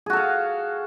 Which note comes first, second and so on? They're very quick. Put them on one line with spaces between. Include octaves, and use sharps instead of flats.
G#4 F#4 A4 F5